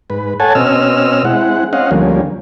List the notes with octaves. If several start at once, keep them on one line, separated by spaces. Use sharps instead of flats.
G#2 B4
A4 C#5 F#5 G#5 A5
B2 C4 C#4 D#5 E6 F6
G#3 C4 E4 F#5
C4 C#4 D#5 F5 F#5
D2 F3 G3 A#3 C#4